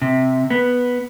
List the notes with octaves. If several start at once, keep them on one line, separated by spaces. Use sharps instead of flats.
C3
B3